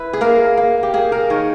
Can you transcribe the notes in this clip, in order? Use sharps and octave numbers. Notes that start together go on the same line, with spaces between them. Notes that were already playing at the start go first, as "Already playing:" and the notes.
Already playing: E4 B4
G#4
A#3 A#4
A#3
G4
A#3 G#4
A#4
D#3 C#5